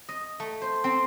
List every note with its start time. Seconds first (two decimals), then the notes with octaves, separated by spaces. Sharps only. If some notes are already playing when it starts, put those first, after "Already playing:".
0.09 D#5
0.40 A3
0.62 C5
0.84 C4